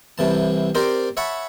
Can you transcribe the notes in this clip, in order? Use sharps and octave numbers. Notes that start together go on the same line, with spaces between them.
C2 C3 E3 A5
C4 G4 A#4 C5 D5
C#5 E5 F#5 A5 B5 C#6